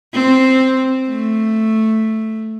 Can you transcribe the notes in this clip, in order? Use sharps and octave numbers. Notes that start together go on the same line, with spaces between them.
C4
A3